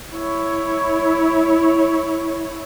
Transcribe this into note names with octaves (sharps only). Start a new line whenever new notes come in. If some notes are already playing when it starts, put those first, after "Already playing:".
E4 C#5